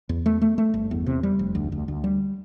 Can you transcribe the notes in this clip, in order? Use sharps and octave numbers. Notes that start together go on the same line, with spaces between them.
E2
A3
A3
A3
G1
E2
C3
G3
F1
D2
D2
D2
G3